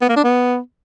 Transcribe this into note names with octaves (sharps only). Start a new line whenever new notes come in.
B3
A#3
D4
B3